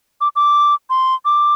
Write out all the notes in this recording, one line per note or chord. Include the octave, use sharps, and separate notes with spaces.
D6
D6
C6
D6